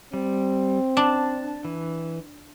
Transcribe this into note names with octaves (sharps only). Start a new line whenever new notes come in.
G3 C4
D4 A5
E3